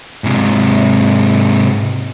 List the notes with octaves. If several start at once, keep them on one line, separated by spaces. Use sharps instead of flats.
G#2 C3